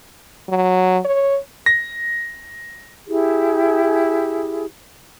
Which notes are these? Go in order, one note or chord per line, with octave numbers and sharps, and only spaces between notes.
F#3
C#5
A#6
E4 G4 G#4